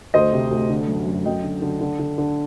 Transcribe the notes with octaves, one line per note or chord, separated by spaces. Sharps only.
D2 C5 D#5
C3
D2
D3
F#2
F#2
F#2 D#5 G5
D3
D3
D3
D3
D3